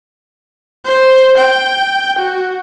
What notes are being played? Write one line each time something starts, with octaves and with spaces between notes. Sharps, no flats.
C5
G5
F#4